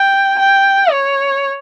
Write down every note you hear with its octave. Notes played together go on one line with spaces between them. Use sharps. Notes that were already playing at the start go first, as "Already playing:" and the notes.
Already playing: G5
G5
C#5